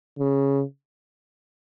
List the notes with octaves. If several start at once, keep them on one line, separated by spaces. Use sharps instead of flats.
C#3